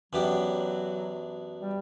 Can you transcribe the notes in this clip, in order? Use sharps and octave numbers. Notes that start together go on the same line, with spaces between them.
F#2 E3 F#3 B3 D4 G4
G3